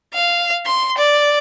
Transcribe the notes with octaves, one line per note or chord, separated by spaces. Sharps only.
F5
C6
D5